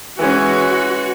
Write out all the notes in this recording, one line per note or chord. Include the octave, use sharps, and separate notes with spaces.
E3 G#3 C#4 F#4